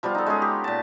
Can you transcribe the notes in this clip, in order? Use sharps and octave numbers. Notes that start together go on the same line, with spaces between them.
F3 G3 B3 F4
D#4 A4
G#3 C#4 G#4
G4
A#2 A5